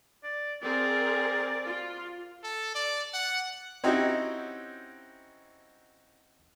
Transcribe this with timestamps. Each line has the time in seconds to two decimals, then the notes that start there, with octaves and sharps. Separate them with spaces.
0.24 D5
0.62 C4 G#4 A#4 D5
1.66 F4
2.43 A4
2.75 D5
3.13 F#5
3.84 C4 C#4 D#4 E4 F#4 G4